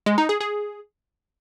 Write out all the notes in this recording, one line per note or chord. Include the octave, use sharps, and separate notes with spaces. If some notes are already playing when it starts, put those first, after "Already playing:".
G#3
D#4
G#4
G#4